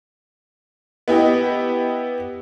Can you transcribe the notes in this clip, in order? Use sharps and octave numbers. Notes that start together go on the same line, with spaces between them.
B3 E4 G4 D#5